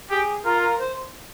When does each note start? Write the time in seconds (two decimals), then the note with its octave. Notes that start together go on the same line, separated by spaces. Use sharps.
0.10 G4 G#4
0.45 F4 A#4
0.62 A#4
0.79 C5